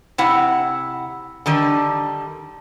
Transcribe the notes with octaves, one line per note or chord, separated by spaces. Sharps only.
C3 E4 F#5
D3 D#3 G3